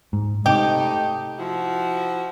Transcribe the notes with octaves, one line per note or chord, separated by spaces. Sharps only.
G#2
C3 A3 D#4 G4
F3 E4 F#4